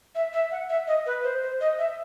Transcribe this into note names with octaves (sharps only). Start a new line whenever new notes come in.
E5
E5
F#5
E5
D#5
B4
C5
C5
D#5
E5